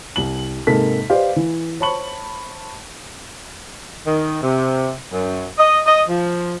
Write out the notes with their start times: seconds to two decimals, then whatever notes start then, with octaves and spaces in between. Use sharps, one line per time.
0.16 C2 F#7
0.67 G#2 C3 G#3 A#3 A4 B6
1.10 G4 B4 C5 D5 D#5 F5
1.36 E3
1.80 C5 C#5 A5 B5 C#6 F#7
4.06 D#3
4.43 C3
5.13 F#2
5.58 D#5
5.86 D#5
6.08 F3